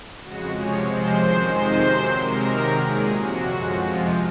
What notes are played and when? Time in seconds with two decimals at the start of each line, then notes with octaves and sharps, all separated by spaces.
0.22 F2 C#3 G#3 F#4
0.55 C3 F3 G#3 C#5
0.88 C3 F3 G#3 C5
1.21 F#2 D#3 G#3
1.54 F2 C3 D#3 G#3 C5
1.87 C3 F#3
2.20 C3 D#3 G#3 A#4
2.52 C3 D#3 F#3
2.85 A#2 G#3 G#4
3.17 F2 C3 F#3 F#4
3.50 F#2 F3 G#3
3.83 F2 C3 F3 G#3 F4